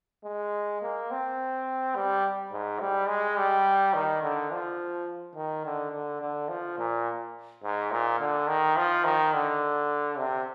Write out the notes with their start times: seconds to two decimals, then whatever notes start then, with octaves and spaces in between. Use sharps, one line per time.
0.24 G#3
0.82 A#3
1.11 C4
1.96 G3
2.52 G#2
2.80 G3
3.08 G#3
3.37 G3
3.94 D#3
4.22 D3
4.51 F3
5.36 D#3
5.65 D3
5.92 D3
6.21 D3
6.49 F3
6.79 A#2
7.63 G#2
7.91 A#2
8.20 D3
8.48 D#3
8.76 F3
9.04 D#3
9.34 D3
10.18 C3